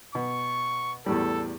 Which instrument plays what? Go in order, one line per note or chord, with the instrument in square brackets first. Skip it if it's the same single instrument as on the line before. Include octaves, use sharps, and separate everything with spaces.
[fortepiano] B2 [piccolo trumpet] C#6
[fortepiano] E2 A2 G3 [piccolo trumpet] A4